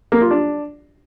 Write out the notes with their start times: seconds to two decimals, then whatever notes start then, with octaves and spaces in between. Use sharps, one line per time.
0.12 A#3
0.21 F4
0.31 D4